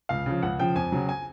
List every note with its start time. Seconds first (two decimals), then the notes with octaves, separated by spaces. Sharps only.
0.09 C#2 F5
0.26 C#3 F3
0.43 C#2 F#5
0.59 C#3 F3 G5
0.76 F2 G#5
0.92 C#3 F#3
1.09 G#5